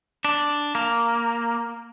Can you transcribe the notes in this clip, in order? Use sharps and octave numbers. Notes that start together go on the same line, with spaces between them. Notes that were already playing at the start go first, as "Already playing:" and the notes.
D4
A#3